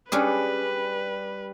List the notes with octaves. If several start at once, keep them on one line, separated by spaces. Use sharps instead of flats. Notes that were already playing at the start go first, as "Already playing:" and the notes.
G3 C#4 D4 G#4 B4